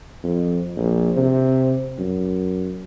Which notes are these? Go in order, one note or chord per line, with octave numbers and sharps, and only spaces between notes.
F2
A#1
C3
F#2